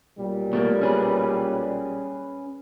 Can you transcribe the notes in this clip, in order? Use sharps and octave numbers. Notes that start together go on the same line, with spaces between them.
B1 A#2 G3
B2 A3 A#3
C#4 G#4 B4